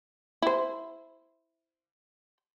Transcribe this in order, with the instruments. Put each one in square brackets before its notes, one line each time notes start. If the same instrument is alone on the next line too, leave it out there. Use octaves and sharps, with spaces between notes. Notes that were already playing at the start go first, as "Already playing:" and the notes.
[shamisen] E4 C5